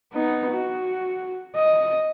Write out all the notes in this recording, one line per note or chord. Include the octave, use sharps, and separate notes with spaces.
B3 D#4
F#4
D#5